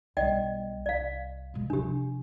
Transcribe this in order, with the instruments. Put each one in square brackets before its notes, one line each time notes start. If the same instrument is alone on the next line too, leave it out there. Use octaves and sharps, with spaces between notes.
[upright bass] B1 G3 [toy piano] D5 D#5 G5
[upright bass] C2 [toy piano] D5 F5
[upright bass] B2 G#3
[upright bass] C3 F3 [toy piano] D4 G4